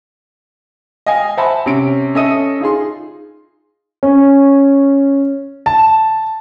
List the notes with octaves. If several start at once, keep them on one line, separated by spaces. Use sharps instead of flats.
D#5 F5 G5 G#5
C5 E5 F#5 G#5 A5 B5
C3 C#4 D7
C#4 A4 D#5 E5 D#6 D#7
D#4 F4 G#4 C6
C#4
A5